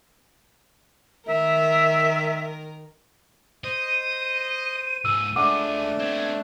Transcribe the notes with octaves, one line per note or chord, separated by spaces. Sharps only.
D#3 A#4 E5
C5 D#5 D#7
C#2 G#2 E6
C#2 G#3 A3 D4 F#5 D6
B3 C4 G#6